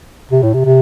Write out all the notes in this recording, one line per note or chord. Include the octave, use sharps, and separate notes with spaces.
C3
A2
C3
C3